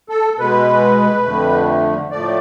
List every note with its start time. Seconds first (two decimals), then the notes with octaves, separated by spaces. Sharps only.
0.09 A4
0.39 B2 G#3 B4
1.25 F2 D3 A3
2.11 A2 F3 A3 D5